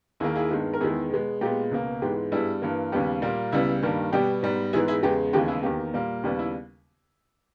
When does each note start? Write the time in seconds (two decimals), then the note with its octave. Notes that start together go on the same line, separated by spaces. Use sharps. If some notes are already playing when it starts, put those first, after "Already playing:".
0.20 D#2 D#3 A#3 E4 G#4
0.36 E4 G#4
0.51 G2 D#3 G#3 B3
0.74 A#4
0.81 E2 D#3 G#3 B3 E4 G#4
1.11 B2 G#3 B3
1.41 A#2 G#3 B3 G4
1.71 C#2 B2 A#3
2.02 G#2 E3 G#3 B3 G4
2.32 G2 G3 B3 E4 G#4
2.62 G2 E3 A#3
2.92 D#2 C#3 G3 B3 G4
3.22 A#2 G3 A#3
3.52 C#2 C#3 G3 B3 E4
3.82 G2 D#3 G3 A#3
4.13 B2 G3 B3 G4
4.43 G#2 G3 B3
4.73 G#2 E3 G#3 B3 E4 G#4
4.88 E4 G#4
5.03 E2 C#3 G#3 B3 G4
5.33 D#2 C#3 E3 G#3 B3 G4
5.48 E4 G#4
5.63 E2 D#3 A#3 G4
5.94 A#2 G3 A#3
6.23 D#2 C#3 G3 B3 G4
6.39 E4